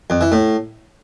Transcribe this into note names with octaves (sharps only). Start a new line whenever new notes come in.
F2
E3
A2